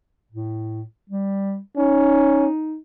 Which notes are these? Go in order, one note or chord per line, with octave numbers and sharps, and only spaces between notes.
A2
G3
C#4 D#4